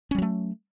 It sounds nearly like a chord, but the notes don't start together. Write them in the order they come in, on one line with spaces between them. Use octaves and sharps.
C#4 G3 F#3 A3